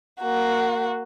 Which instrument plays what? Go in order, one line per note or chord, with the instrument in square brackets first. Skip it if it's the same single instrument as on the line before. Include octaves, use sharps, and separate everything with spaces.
[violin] A#3 F#4